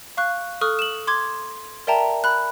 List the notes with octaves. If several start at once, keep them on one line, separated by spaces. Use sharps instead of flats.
F5 C#6 F#6
A4 C#6 D#6 F6 F#6
E7 F#7
C6 D6 G#6
A#4 D5 E5 G5 A5 A#5
B5 F#6